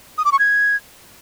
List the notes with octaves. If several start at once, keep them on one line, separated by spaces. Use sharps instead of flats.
D#6
D6
C#6
G#6